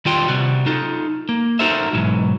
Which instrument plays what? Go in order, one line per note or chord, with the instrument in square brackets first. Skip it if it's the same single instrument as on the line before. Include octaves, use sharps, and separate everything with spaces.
[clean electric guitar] D#3 G3 F4 G5 C6
C3 G3 F#4
D#4 F4 A4
A#3
D#4 F#4 A4 A#4 C5 E5
B1 G#2 E3 F#3